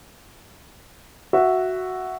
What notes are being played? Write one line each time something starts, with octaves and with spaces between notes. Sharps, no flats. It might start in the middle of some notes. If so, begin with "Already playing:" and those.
F#4 E5